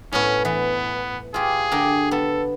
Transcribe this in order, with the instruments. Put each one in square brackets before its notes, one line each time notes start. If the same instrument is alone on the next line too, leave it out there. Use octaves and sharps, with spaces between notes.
[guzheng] A2 B3 [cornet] C#4
[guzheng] E3 [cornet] B3
[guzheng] F4 G4 [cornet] G#4
[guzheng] D3 G4 A#4
[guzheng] B3 [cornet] A4